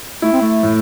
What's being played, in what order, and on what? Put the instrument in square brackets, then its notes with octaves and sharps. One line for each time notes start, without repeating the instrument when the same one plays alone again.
[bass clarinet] A3 [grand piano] E4
[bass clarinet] C4
A3
[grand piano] A2